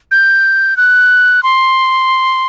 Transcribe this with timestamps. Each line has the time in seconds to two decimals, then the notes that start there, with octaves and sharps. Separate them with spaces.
0.11 G6
0.77 F#6
1.43 C6